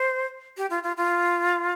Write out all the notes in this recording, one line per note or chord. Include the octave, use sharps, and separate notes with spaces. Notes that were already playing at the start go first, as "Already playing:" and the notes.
Already playing: C5
G4
F4
F4
F4